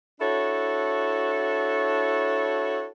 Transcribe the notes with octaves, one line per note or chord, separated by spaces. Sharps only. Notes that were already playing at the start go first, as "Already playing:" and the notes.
D4 E4 F#4 A4 C#5